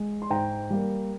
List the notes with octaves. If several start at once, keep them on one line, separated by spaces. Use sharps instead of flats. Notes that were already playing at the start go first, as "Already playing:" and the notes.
Already playing: G#3
C6
G#2 G5 A#5
G3 A#3